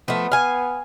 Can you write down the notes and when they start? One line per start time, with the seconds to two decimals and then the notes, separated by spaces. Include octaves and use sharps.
0.08 F3 A3 B3
0.32 F5 G#5